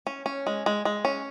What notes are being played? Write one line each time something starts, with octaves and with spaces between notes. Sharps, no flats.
C#4
C#4
G#3
G#3
G#3
C#4